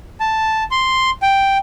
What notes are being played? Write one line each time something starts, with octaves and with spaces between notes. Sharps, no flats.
A5
C6
G5